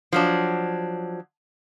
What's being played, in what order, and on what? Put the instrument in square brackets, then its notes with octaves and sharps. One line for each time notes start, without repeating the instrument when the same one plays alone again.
[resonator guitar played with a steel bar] F3 F#3 D4